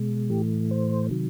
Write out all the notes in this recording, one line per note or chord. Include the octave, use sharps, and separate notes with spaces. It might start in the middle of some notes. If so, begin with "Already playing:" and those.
Already playing: B2 G#3
A2 E3 A3 G4
C5
C3 D#3 F#3